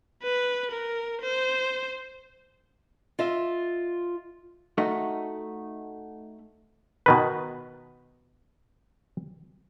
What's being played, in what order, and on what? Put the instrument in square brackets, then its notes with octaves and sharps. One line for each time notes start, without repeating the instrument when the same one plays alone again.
[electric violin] B4
A#4
C5
[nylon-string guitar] F4 D#5 E5
[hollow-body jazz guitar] A3 D#4 F#4
[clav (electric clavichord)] B2 D#3 B4